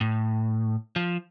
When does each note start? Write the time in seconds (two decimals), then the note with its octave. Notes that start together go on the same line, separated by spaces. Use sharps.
0.01 A2
0.96 F3